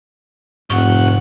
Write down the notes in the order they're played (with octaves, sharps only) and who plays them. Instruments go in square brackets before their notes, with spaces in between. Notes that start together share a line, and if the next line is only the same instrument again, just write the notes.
[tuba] F1 [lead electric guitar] D2 F#5 [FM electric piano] G#2 [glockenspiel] C#6